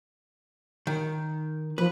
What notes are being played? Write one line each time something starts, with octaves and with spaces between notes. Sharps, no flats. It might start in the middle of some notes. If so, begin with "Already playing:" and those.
D#3
F3 B4